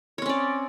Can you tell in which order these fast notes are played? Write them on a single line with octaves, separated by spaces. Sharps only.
C#5 C4 C#4 D5